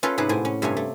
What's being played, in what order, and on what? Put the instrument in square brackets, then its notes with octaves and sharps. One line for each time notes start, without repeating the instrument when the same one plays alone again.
[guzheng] C#4 F4 A4 B4 C#5 F5
G#2 C3 G#4 B4 F#5 A5
A2 C5 G#5
C#4
G2 C3 A3 C#5 F5 G#5
A3